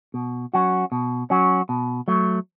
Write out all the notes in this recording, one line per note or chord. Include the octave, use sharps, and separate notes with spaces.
B2
F#3 C#4 F#4
B2
F#3 C#4 F#4
B2
F#3 A3